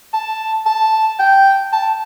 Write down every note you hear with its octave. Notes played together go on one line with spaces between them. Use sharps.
A5
A5
G5
A5